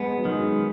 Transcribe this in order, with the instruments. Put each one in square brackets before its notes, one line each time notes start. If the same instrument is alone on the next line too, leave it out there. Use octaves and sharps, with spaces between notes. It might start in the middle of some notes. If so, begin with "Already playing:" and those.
Already playing: [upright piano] G#3 [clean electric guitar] B3
[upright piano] F#3
[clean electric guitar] D#3 [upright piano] G#3